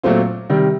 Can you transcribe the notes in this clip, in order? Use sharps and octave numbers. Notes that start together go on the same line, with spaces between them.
A#2 F#3 A3 C4 F4
C3 D#3 G3